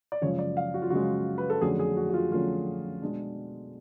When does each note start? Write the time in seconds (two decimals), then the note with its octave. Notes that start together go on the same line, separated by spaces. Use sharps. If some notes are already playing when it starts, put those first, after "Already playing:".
0.12 D5
0.22 F#2 C#3 F3 G#3 C#5
0.39 D5
0.57 F5
0.74 F#4
0.82 F4
0.90 F#2 C#3 F3 G#3 F#4
1.38 B4
1.50 A4
1.61 F2 D3 F#3 A3 C#4 G#4
1.79 G#4
1.97 F#4
2.10 F#4
2.14 F4
2.31 F2 D3 F#3 A3 C#4 F4
3.02 B2 G#3 D4